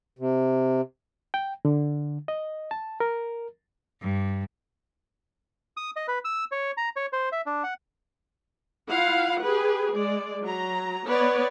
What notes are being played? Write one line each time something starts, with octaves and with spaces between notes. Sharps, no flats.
C3
G5
D3
D#5
A5
A#4
G2
D#6
D#5
B4
E6
C#5
A#5
C#5
C5
E5
D4
F#5
E4 F4 F5 F#5
G4 G#4 B4
G#3 D5
F#3 A#5
B3 B4 C#5 D5